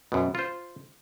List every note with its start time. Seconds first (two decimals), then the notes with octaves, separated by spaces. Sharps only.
0.12 F#2 B2
0.35 F4 C5